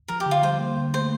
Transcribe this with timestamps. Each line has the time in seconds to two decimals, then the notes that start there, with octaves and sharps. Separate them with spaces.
0.08 F3 A#4
0.20 G4
0.26 D3
0.31 F4
0.43 G3 C5
0.59 A#3
0.77 D3
0.93 A3 C5